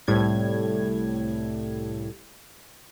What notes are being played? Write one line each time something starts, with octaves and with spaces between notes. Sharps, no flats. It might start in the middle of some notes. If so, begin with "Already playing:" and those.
C2 A2 G3 G#6